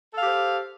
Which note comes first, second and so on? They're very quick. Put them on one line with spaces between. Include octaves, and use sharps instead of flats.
A4 F5 G4 C5